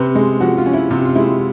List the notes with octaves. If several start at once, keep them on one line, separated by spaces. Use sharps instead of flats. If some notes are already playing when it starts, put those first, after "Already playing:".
Already playing: C3 B4
G#3
F3 F#4
F4
C#4
E4
C3 F4
F4
G#3 E4